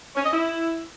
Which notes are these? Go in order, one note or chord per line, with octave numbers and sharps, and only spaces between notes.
C#4
D#5
E4